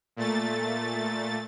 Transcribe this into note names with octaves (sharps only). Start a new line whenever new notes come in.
A#2 A3 A6